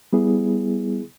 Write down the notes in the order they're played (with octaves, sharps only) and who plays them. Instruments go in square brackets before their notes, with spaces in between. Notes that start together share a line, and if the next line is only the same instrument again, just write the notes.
[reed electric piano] G3 B3 E4 G#4